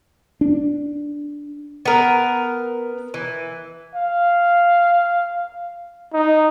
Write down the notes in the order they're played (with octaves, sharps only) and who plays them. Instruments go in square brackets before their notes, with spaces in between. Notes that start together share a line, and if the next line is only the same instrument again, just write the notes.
[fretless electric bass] D4
[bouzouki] B3 A#4
E3
[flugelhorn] F5
D#4